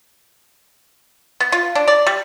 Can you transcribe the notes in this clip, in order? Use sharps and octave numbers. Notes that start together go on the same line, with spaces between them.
B3
F4
D4
D5
G3